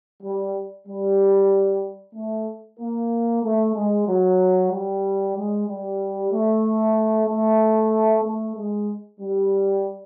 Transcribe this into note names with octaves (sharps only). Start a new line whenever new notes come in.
G3
G3
A3
A#3
A3
G#3
F#3
G3
G#3
G3
A3
A3
A3
G#3
G3